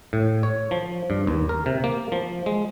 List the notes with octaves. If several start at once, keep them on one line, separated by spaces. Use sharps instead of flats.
A2
C#5
F3
G2
D#2
A#4
C3
A#3
F3
G#3